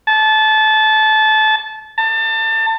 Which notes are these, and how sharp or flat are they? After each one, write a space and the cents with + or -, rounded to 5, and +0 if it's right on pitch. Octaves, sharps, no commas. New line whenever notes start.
A5 -25
A5 +25